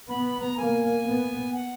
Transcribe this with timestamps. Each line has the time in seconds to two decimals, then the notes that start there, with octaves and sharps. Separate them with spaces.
0.09 B3 B5
0.25 B5
0.41 A#5
0.57 A#3 G#5
1.05 B3
1.53 F#5